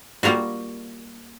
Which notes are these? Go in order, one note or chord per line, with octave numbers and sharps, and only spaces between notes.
G3 A#3 F4 F#4